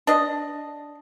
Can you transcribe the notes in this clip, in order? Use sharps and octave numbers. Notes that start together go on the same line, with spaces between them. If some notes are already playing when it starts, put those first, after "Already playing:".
D4 D#5